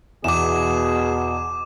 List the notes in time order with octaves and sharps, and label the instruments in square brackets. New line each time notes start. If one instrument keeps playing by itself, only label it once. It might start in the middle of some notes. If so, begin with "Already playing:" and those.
[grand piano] E2 [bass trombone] B2 [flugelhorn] G#4 [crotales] D6 E7